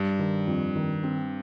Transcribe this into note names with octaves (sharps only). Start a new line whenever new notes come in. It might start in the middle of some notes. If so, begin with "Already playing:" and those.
Already playing: G2
D#3
F2
D#3
C4